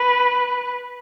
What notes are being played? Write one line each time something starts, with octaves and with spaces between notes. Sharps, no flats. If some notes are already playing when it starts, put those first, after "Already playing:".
Already playing: B4